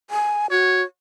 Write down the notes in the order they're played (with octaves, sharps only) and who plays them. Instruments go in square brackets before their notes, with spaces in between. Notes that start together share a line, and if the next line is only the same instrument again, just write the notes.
[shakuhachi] G#5
[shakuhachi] F#4 [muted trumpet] C#5